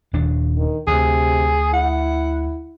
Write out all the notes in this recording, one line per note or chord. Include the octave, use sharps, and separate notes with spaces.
D#1 D#2 D4
D#3
D2 C3 G#4
E4 F#5